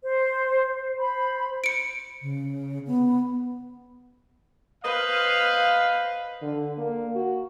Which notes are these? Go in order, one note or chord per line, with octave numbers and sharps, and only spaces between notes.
C5
C5 B5
C#7 D7
C#3
B3
B4 C5 D#5 F5
D3
A#3
F#4